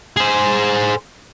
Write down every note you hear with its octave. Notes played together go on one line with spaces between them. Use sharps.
G#4 C5